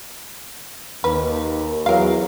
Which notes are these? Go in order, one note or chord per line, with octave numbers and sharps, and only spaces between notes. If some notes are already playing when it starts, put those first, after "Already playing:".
D#2 B4
E2 E3 F#3 A#4 F5